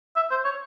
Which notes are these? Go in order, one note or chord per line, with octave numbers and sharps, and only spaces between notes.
E5
C5
C#5